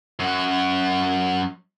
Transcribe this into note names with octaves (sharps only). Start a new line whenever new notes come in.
F#2 F#4